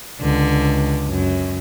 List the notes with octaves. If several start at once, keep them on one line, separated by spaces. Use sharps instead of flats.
C#2 D3
F#2